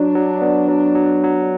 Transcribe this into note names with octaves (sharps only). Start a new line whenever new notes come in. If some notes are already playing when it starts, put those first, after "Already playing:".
Already playing: F#3 D4
F#3
B3
F#3
F#3
F#3